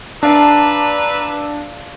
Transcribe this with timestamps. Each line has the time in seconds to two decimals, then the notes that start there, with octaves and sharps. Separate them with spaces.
0.23 D4 B4 D5 F5 A5 A#5 E6